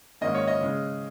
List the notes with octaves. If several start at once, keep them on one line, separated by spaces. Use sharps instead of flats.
G#2 D#3 A#3 C#4 D#5
C#5
D#5
C#3 G#3 C#4